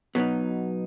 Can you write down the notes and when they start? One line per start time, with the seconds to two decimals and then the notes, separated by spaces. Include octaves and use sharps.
0.15 B2 F#3 B3 D#4